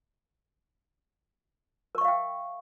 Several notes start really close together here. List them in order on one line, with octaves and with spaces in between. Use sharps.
A#4 C#6 E5 F5 G5